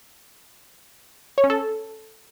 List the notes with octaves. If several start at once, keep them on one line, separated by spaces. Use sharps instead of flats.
C#5
C#4
A4